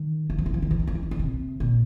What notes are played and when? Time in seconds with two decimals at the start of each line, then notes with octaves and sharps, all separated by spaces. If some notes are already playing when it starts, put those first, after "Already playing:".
Already playing: D#3
0.30 D#3
0.39 F3
0.46 D#3
0.54 F3
0.62 D#3
0.71 F3
0.79 D#3
0.87 D3
0.95 F3
1.03 D#3
1.11 D3
1.19 C3
1.60 A#2